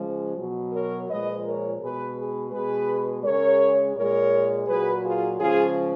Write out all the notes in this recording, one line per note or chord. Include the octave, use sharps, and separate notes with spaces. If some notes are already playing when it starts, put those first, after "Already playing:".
Already playing: C#3 F3 G#3
B2 F#3
A#4 C#5
A#2 F3 G#3 B4 D#5
A#4 C#5
B2 G#3 G#4 B4
G#4 B4
B2 G#3 G#4 B4
C#3 G#3 A#4 C#5
A#2 G#3 A#4 C#5
A#2 F#3 G#4 B4
F4 G#4
C#3 F3 G#3 F4 G#4